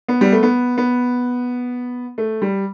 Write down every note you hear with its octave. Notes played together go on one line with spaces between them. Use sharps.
B3
G3
A3
B3
B3
A3
G3